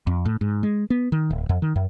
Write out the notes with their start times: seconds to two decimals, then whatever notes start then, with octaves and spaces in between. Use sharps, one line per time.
0.07 F2
0.25 A2
0.41 G#2
0.63 G#3
0.90 B3
1.12 D#3
1.30 D1
1.49 F2
1.62 D#3
1.76 F#2